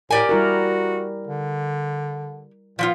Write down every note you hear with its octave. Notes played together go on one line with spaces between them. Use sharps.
A2 G4 A#4 D5 G#5
G3 E4 F#4 A#4
D3
A#2 F3 B3 F4